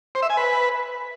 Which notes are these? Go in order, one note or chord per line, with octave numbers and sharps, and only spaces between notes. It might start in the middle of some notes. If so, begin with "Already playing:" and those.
C5
E5
G#5
B4